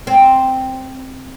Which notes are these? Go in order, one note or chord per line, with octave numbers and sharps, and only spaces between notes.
C4